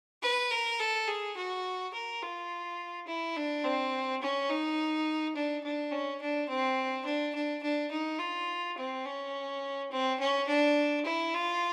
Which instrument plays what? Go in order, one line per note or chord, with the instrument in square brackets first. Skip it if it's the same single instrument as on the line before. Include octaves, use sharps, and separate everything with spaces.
[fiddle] B4
A#4
A4
G#4
F#4
A#4
F4
E4
D4
C4
C#4
D#4
D4
D4
C#4
D4
C4
D4
D4
D4
D#4
F4
C4
C#4
C4
C#4
D4
E4
F4